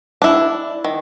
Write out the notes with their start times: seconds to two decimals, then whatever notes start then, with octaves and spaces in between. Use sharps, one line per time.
0.22 D4 E4
0.84 D#3